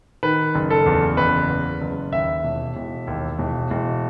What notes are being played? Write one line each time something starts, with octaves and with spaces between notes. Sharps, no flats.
D#3 B4
F#1
A4
E2
F#1 B4
E2
F#1
D#2 E5
E1
E1
D#2
E1
E1